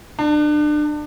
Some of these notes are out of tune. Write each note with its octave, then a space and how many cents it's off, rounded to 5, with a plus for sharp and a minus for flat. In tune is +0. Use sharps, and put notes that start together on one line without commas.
D4 +30